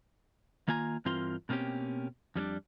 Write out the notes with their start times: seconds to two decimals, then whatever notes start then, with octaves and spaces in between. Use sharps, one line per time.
0.68 D#3 A#3 F4 G#5 A#5
1.05 G2 E3 C4 F4 A#4 C6
1.49 B2 A#3 C4 C#4 G4
2.36 F2 G3 C#4 D4